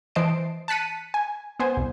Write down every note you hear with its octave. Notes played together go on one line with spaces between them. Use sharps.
E3 C5 D#5 A5 C7 D7
A5 F#6 B6 C#7 D#7
G#5
B3 C5 G#5
C2